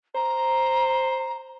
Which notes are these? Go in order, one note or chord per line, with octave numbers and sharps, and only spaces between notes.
C5 A#5